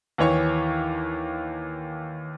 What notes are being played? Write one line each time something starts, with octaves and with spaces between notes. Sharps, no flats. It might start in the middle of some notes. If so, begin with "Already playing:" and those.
D#2 E3 C#5 C#6